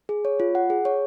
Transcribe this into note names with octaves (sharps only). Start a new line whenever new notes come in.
G#4
C#5
F4
F#5
G#4
C#5